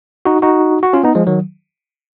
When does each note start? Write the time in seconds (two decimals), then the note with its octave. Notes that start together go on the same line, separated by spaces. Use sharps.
0.25 D#4 F#4
0.42 D#4 F#4
0.83 F#4
0.93 C#4 F4
1.03 B3 D#4
1.15 F3 G#3
1.27 D#3 F#3